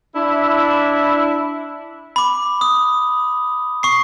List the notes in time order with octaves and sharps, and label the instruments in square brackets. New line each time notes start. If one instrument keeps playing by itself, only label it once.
[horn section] D4 E4
[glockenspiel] B5 D6
D#6
C#6 C7